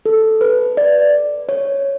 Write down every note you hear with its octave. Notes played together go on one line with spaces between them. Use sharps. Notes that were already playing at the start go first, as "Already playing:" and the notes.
A4
B4
D5
C#5